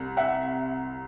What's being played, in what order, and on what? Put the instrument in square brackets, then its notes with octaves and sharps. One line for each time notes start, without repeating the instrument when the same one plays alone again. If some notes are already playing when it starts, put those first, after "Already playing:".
Already playing: [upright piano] C2
E5 F#5